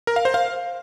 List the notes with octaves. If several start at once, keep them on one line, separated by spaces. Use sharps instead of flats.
A#4
F5
C5
F5